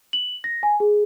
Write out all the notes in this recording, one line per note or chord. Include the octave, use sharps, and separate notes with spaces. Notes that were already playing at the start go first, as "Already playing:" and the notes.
F#7
A#6
G#5
G#4